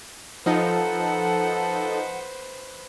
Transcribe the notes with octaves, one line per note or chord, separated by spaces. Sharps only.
F3 D#4 A4 B4 C5 F#5